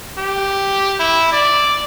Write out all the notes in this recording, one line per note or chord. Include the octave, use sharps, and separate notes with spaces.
G4
E4
D5